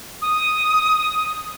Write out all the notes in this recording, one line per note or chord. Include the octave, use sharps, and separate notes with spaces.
D#6